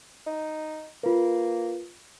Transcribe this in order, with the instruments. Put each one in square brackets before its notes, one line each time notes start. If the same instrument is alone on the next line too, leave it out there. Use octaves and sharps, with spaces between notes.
[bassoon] D#4
[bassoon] A#3 [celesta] F4 B4